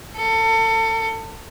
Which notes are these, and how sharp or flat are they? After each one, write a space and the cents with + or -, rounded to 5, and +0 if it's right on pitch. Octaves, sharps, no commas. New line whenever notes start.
A4 +30